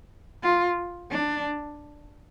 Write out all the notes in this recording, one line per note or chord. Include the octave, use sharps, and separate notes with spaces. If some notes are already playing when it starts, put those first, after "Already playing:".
F4
D4